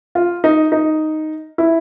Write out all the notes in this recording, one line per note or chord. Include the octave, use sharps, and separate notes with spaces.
F4
D#4
D#4
E4